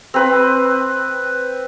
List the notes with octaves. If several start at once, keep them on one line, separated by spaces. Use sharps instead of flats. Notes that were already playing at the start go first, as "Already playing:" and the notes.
C4 B4